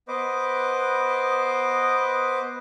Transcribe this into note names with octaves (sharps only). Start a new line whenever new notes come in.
B3 B4 C5 D#5 D6